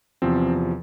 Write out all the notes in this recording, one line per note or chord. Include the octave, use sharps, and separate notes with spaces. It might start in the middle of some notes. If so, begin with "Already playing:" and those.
E2 C3 F3 C4